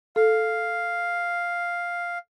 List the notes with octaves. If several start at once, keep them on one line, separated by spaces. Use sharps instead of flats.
A4 F5